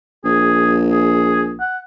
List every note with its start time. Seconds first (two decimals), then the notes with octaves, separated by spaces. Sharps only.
0.25 A#1 G#4
0.91 G#4
1.60 F#5